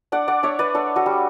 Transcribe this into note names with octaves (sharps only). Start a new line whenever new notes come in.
D4 D5 F#5
D5 F#5
D4 C#5 E5
B4 D5
D4 A4 C#5
F#4 A4
G3